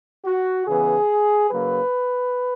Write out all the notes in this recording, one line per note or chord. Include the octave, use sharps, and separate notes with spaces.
F#4
C#3 E3 B3 G#4
C#3 F#3 A#3 B4